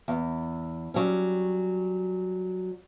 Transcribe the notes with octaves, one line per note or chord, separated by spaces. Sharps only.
E2
F#3 G3 C#4